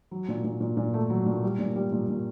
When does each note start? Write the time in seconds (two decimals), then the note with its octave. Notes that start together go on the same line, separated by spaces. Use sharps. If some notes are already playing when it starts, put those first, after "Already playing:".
0.11 F#3
0.28 A#2
0.44 A#2
0.60 A#2
0.77 A#2
0.94 A3
1.10 F#3
1.26 A#2
1.43 G3
1.59 A#2
1.75 G3
1.92 A#2
2.09 A#2